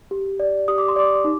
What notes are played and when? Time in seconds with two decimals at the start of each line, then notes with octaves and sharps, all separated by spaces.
0.11 G4
0.40 D5
0.68 G4 D#6
0.78 D6
0.88 C6
0.96 D5 D6
1.24 D#4